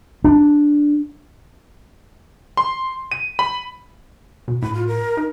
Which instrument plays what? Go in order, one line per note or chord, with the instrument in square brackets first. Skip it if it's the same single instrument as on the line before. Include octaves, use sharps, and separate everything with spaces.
[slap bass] D4
[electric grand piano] C6
D#7
B5
[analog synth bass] B2
[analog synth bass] A2 [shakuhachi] B5
[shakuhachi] F4
A#4
[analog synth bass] D#4